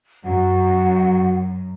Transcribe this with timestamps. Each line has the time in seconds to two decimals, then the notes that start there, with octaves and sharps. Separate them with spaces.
0.24 F#2 F#4 F#5